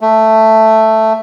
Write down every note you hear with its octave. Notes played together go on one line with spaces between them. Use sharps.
A3